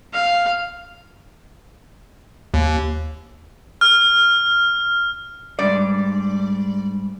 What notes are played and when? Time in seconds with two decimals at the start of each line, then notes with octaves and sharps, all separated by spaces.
0.14 F5
2.54 D#2
3.81 F6
5.59 G#2 G3 D4 D5